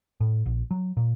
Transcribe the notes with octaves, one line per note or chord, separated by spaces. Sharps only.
A2
A#1
F#3
A#2